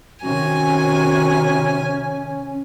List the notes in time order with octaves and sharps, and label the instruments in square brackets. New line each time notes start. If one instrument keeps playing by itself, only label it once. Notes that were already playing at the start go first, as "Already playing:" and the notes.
[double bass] C3 D#3 [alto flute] C#4 [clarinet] F#4 [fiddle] G#5